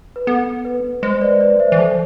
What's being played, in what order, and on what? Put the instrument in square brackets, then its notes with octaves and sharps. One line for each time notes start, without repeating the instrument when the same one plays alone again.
[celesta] B4
[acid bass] B3 [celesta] A4
[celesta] B4
[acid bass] G#3 [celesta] C5
[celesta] B4 D5
B4 D5
C5 E5
[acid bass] E3
[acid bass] F3 [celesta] A4